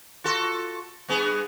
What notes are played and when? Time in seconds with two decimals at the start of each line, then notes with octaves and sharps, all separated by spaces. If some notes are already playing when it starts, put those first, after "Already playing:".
0.24 F4 F#4 A4
1.09 G2 B3 G#4